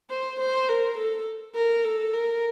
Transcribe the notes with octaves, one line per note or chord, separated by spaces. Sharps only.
C5
C5
A#4
A4
A#4
A4
A#4